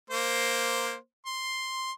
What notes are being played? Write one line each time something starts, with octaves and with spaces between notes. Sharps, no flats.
A#3 C5
C6